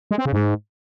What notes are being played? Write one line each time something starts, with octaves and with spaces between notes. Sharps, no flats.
G#3
C4
C#3
G#2